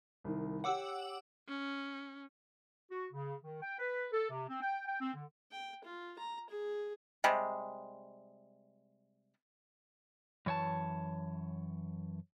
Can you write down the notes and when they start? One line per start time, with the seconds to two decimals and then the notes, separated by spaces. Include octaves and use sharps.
0.24 C2 D#3
0.64 G4 C#5 F#5 D6 E6
1.48 C#4
2.91 F#4
3.12 C#3
3.43 D#3
3.61 G5
3.78 B4
4.12 A4
4.30 C3
4.48 C4
4.61 G5
4.87 G5
5.00 C4
5.14 D3
5.51 G5
5.84 F4
6.19 A#5
6.50 G#4
7.24 C3 G3 G#3
10.46 F#2 E3 C#5 G#5 A5